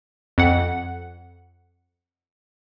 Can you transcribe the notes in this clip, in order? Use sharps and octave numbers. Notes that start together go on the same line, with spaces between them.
F2 F#5